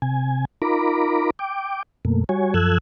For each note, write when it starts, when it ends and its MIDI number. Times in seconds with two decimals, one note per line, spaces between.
0.02 0.45 48
0.02 0.45 80
0.62 1.30 63
0.62 1.30 65
0.62 1.30 70
0.62 1.30 82
0.62 1.30 83
0.62 1.30 86
1.39 1.83 79
1.39 1.83 86
2.05 2.24 42
2.05 2.24 47
2.05 2.24 57
2.05 2.24 58
2.29 2.54 55
2.29 2.54 66
2.29 2.54 73
2.29 2.54 80
2.54 2.78 42
2.54 2.78 53
2.54 2.78 69
2.54 2.78 88
2.54 2.78 90
2.54 2.78 92